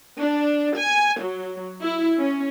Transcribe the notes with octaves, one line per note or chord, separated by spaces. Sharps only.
D4
G#5
F#3
E4
C#4